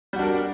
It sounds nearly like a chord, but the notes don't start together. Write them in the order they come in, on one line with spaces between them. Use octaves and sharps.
G3 F#4 D4 A#4